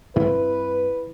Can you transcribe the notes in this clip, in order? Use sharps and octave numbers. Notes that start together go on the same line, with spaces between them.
G2 C4 E4 B4